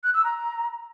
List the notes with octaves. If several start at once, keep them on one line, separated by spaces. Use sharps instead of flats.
F#6
E6
A#5